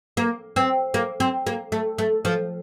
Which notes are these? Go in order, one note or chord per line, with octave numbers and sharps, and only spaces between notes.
A#3
C4
A#3
C4
A#3
A3
A3
F3